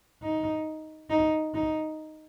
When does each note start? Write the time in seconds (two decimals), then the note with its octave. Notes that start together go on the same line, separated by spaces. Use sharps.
0.22 D#4
1.10 D#4
1.54 D#4